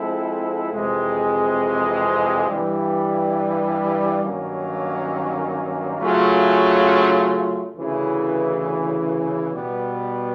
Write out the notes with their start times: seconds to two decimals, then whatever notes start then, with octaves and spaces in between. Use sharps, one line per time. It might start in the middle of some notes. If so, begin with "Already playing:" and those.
Already playing: F3 G#3 C4 E4 A4
0.71 F2 C3 E3 G#3
2.47 G2 E3 G3
4.23 G2 D#3 F#3 A#3 C#4
5.99 C#3 F#3 A3 C#4 F4
7.76 D2 C#3 E3
9.52 B2 G3 B3